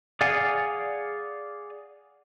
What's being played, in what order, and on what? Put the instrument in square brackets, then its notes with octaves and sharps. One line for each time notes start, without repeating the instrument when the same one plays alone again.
[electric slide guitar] G#4 D5 F5 F#5 G#5